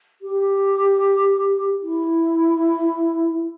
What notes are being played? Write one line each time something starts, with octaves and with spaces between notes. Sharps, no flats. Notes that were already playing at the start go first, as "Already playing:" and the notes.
G4
E4